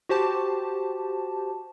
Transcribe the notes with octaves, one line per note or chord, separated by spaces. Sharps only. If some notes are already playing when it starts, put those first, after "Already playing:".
F#4 G4 C5 A5